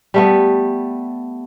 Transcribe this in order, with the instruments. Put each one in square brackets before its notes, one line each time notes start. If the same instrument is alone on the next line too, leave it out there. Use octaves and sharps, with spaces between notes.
[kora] G3 A3 B3